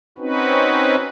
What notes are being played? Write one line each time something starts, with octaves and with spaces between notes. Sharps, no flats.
C4 C#4 D#4 F#4 B4